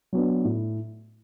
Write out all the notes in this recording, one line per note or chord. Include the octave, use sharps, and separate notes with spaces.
F#3 B3 D4
A2